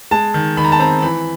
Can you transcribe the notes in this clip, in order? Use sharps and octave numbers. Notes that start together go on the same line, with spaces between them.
G#3 A5
D#3
D#3 B5
A#5
A5
C4 A#5
E3 B5